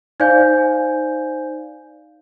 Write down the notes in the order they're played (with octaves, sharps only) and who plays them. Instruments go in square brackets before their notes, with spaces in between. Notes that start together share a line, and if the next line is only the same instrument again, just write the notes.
[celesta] D#4 C5 D5 F5 G#5 G6